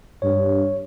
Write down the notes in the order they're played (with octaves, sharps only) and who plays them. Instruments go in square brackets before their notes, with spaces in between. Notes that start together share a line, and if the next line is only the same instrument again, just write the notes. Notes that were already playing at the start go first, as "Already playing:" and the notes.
[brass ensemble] G2 [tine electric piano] C#5